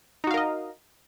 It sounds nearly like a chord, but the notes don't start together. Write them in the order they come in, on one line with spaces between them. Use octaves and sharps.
D#4 F#4 F5 A#4 D#5